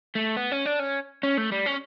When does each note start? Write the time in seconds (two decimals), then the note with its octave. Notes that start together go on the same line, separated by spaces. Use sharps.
0.15 A3
0.37 B3
0.51 C#4
0.65 D4
0.79 C#4
1.23 C#4
1.38 A3
1.52 G3
1.66 C#4